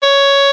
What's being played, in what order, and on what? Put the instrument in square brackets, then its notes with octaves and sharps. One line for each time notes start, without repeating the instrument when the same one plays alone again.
[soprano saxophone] C#5